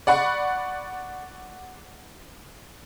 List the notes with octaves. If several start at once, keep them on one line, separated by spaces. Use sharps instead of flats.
D5 F#5 B5 C#6